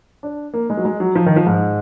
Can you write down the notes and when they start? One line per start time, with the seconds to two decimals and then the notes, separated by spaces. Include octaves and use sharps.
0.23 D4
0.54 A#3
0.70 G#3
0.77 F#3
0.85 G#3
1.00 F#3
1.15 F3
1.26 D#3
1.36 F3
1.46 G#2